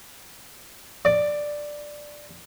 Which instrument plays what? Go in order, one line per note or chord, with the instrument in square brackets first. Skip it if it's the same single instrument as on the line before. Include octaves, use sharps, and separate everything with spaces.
[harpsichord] D5